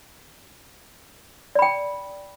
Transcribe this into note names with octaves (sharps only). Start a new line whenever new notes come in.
D5 G5 B5